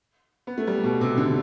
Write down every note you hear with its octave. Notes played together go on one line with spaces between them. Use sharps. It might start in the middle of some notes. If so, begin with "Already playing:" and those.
B3
A3
G3
B2
C3
D3